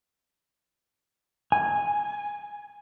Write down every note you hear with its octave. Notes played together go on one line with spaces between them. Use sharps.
G#5